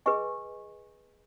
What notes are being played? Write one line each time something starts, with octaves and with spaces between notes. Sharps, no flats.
G#4 B4 D#5 G#5 C#6